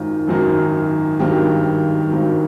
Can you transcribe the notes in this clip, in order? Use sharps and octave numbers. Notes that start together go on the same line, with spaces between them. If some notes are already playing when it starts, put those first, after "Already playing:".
Already playing: G#1 F#2 D#3 F#3 F4
G#1 F#2 D#3 F#3
G#1 G2 D#3 F#3 G4
G#1 G2 D#3 F#3